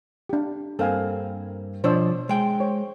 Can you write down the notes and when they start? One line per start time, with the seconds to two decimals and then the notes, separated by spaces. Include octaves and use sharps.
0.29 D4 G4
0.79 G2 A#3 C4 A4 F5 G#5
1.84 B2 F3 D4 C5 C#5 E6
2.29 G#3 G5
2.60 C5 C#5